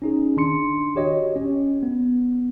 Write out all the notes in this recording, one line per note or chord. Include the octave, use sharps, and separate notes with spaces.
C#4 D#4 G#4
D#3 D4 C6 C#7
F#4 G4 C#5 D#5
C#4
B3